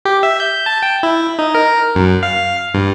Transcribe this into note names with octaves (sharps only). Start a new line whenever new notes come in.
G4
E5
G6
A5
G5
E4
D#4
A#4
F#2
F5
G2